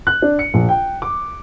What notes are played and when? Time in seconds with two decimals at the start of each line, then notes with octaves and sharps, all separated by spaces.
0.07 F#6
0.22 D4
0.39 C#7
0.54 A#1
0.69 G5
1.02 D6